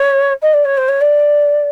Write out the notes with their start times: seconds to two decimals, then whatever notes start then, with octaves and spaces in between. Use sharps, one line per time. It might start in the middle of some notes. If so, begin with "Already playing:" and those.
Already playing: C#5
0.42 D#5
0.53 D5
0.64 C#5
0.77 C5
0.88 C#5
1.01 D5